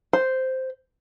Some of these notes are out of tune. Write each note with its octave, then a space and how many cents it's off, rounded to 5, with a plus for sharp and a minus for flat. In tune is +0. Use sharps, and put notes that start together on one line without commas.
C5 -5